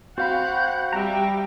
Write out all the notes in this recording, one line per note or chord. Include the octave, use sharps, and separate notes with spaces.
C4 F#4 F5 F#5 B5 G6
G3 E5 G5 A#5